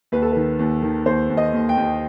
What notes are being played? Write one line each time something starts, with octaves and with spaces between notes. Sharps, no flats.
D#2 B4
A4
D#3 B4
D#2
D#3
D#2 C5
D#2
D#5
D#2
G5
D#2